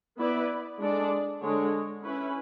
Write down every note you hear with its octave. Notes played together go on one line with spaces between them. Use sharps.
B3 E4 B4 D5
G#3 D4 A4 D5
D3 G#3 D4 A4 C#5
C#4 E4 B4